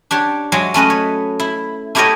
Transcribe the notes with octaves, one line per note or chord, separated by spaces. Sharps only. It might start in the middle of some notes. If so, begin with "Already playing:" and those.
D4 G4 C#5
F#3 G#3 C#5 E5
A3 C#4 B4 D#5
C#5
E4
A3 E4 G4 A#4 C#5 D#5